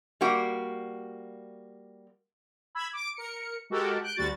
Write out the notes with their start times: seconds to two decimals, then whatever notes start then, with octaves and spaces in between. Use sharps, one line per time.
0.21 G3 A#3 F#4
2.75 B5 E6 G#6
2.93 D6 D7
3.16 A#4 C#7
3.70 G#3 F#4 G4 A4 A#4
4.02 F#6 G6 D7
4.16 D2 G3 F#4 A6